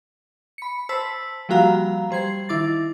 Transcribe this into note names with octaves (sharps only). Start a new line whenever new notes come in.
B5 C#7
C5 A5 E6 B6
F3 G3 A#3 F#4 F5 A#5
G3 C5 G#6 C7
D#3 E4 D6 A6